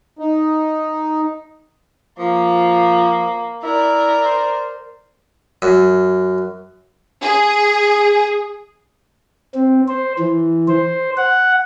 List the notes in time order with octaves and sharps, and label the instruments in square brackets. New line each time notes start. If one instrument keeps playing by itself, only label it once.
[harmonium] D#4
[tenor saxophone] F3 [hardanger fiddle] A#3
[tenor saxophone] E4 [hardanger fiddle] A#4 D5
[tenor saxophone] C5
[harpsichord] F#2
[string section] G#4
[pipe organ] C4
C5
E3
C5
F#5